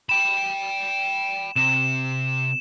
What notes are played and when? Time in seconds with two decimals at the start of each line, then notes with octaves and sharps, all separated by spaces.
0.09 G5 B5 E7
1.56 C3 E7